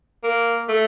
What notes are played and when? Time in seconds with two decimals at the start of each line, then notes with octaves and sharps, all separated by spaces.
0.24 A#3
0.69 A3